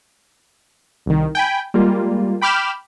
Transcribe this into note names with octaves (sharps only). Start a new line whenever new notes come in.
C2 D#3
G5 G#5 B5
G3 G#3 A#3 F4
G5 B5 D6 F6 G6 E7